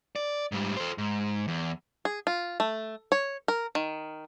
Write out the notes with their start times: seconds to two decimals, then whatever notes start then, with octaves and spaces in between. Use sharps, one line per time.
0.16 D5
0.52 G#2 G3
0.77 A4 C5
0.98 G#2
1.48 E2
2.05 G#4
2.27 F4
2.60 A3
3.12 C#5
3.48 A#4
3.75 D#3